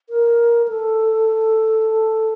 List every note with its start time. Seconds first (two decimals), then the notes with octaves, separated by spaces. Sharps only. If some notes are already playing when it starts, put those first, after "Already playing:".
0.10 A#4
0.68 A4